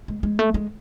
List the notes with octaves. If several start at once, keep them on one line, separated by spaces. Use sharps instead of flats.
G#3
G#3
A3
G#3